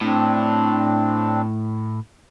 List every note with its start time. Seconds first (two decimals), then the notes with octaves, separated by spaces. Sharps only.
0.01 A2 C4 D4